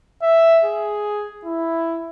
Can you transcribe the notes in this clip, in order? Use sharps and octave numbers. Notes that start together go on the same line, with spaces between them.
E5
G#4
E4